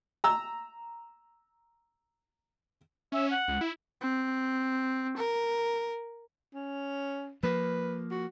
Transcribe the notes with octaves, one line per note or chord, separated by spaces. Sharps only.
A#5 E6
C#4 E5
F#5
C#2
E4
C4
A#4
C#4
F3 A#3 B4
F#4